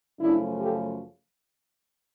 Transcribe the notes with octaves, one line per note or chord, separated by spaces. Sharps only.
F#2 C#3 F3 A3 D4 E4
G4 A4